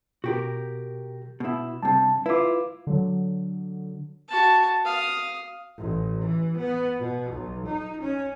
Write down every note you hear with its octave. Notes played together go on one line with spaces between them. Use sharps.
B2 F#4 G4 A#4
B2 E4
G2 C3 A5
E4 F4 B4 D6
D3 F#3
F#4 A5
F5 D#6
A1
E3
B3
B2
B1
D#4
C#4